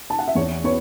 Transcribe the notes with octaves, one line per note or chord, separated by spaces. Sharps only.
A5
F#5
E5
E2 C#5
B3 C#5